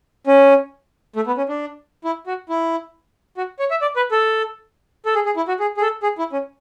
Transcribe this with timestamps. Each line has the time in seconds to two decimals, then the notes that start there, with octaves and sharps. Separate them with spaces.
0.27 C#4
1.16 A3
1.27 B3
1.37 C#4
1.49 D4
2.04 E4
2.27 F#4
2.49 E4
3.37 F#4
3.59 C#5
3.71 E5
3.82 D5
3.96 B4
4.11 A4
5.06 A4
5.15 G#4
5.26 G#4
5.36 E4
5.48 F#4
5.60 G#4
5.77 G#4
5.81 A4
6.03 G#4
6.18 E4
6.33 C#4